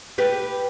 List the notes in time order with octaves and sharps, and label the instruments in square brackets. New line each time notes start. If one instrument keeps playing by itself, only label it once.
[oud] G4 B4